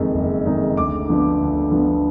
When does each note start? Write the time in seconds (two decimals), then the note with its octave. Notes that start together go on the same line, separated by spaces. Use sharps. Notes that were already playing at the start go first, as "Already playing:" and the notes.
Already playing: F#1 F2 D#3 G#3 D#4
0.14 F#1
0.45 F2 D#3 G#3 D#4
0.77 D2 D6
1.08 D3 F3 B3
1.41 D2
1.71 D3 F3 B3